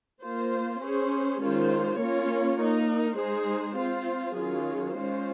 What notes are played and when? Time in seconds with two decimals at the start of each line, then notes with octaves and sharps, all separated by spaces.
0.22 A#3 F4 C5
0.81 C#4 G#4 C5
1.40 D#3 G#3 C#4 F4 C5
1.99 A#3 C#4 F4 A#4 C#5
2.58 A#3 D#4 A#4
3.17 G#3 D#4 G#4 C5
3.77 C4 F4 C5
4.35 D#3 F#3 C#4 F4 G#4
4.94 G#3 C#4 F4 C5